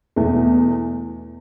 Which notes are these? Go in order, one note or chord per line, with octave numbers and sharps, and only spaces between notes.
E2 B2 A3